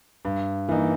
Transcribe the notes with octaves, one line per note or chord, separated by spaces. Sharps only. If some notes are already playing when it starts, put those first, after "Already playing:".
G2
E3 A#3 D#4